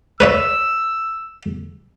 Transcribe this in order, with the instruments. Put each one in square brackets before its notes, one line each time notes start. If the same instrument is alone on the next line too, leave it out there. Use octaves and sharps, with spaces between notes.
[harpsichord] B4 C#5 E5 [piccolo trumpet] E6